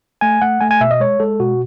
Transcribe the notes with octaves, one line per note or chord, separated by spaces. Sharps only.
A3 G#5
A3 F#5
A3 G#5
G#5
B2 E5
D#5
G#3 C#5
G#3 A4
B2 F#4